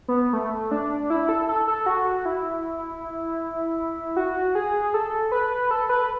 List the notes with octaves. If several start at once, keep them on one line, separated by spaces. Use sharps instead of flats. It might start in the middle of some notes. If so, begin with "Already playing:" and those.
B3
A3
D4
E4
A4
A4
A4
F#4
E4
F#4
G#4
A4
B4
A4
B4